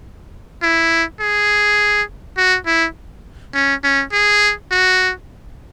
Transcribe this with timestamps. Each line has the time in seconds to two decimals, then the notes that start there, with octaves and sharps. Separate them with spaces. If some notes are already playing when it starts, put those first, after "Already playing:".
0.63 E4
1.20 G#4
2.37 F#4
2.66 E4
3.54 C#4
3.84 C#4
4.12 G#4
4.71 F#4